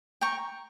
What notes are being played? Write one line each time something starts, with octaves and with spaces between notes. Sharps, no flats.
G5 A#5 C#6